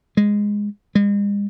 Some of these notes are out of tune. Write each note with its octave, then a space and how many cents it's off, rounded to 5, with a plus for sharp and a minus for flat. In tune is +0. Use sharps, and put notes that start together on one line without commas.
G#3 -10
G#3 -45